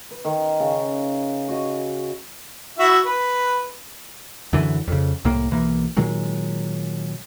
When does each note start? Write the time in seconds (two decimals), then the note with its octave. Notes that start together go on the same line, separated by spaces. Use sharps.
0.11 B4
0.24 D#3
0.60 C#3
1.48 F#4 D#5
2.79 E4 F#4 E5
3.06 B4
4.53 F#2 D3 E3
4.88 F2 C#3
5.24 C2 A2 A#3
5.51 B1 E3 A#3
5.97 A#2 D#3 F#3 G#3